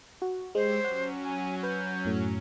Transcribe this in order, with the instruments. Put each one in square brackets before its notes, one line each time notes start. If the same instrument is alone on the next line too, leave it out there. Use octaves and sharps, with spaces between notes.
[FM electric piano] F#4
[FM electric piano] G#3 [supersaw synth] G4 C#5 E6 [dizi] C5
[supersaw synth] F#3 C#4 [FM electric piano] F#5
[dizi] G#5
[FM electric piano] B4 [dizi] G6
[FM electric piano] F#2 A2